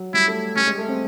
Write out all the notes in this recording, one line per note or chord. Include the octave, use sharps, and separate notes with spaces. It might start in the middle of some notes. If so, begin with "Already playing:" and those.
Already playing: F#3
G3 E4
A3
G3 C#4
G#3
A3
C4